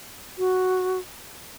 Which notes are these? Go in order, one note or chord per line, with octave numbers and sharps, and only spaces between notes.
F#4